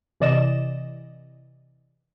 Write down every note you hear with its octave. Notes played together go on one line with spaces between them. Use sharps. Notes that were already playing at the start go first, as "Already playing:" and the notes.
C3 E3 D5 D#5 E7